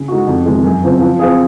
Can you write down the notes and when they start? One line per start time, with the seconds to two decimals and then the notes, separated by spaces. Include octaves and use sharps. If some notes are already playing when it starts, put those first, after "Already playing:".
Already playing: C#3
0.08 G#3 D#4 F#4
0.27 F2
0.46 C3 D#3 G#3
0.64 F#2
0.83 C#3 F3 C4
1.01 F3
1.19 C4 F4 G#4